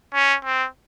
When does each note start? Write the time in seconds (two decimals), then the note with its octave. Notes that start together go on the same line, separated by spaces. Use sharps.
0.14 C#4
0.45 C4